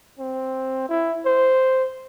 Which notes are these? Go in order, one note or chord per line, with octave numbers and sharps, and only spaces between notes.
C4
E4
C5